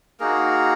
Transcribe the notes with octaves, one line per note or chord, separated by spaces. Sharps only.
A#3 D#4 F#4 G#4 A#4